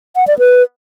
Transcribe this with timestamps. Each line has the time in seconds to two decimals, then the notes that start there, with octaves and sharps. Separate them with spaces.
0.16 F#5
0.27 D5
0.39 B4